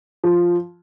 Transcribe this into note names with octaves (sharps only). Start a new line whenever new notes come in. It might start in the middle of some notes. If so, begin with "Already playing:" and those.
F3